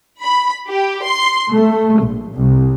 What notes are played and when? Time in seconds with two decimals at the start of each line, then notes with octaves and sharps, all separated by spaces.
0.21 B5
0.69 G4
1.04 C6
1.52 A3
2.01 A#1
2.33 C2